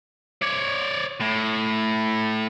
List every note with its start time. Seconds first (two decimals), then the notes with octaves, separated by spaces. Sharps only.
0.42 C#5 D5
1.21 A2